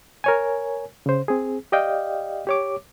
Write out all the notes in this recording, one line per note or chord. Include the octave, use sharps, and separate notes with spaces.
A#4 C#5 G#5
C#3 C5
C4 G#4
G4 D5 D#5 F5 G5
G4 C#5 D6